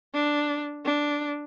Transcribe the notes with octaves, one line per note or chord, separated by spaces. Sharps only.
D4
D4